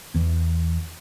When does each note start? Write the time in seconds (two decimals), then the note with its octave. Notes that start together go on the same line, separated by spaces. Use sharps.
0.14 E2 E3